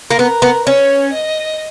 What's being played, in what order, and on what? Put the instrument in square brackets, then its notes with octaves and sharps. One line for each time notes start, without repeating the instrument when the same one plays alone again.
[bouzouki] A#3
[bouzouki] B3 [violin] A#4
[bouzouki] B3
[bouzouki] C#4 [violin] C#5
[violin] D#5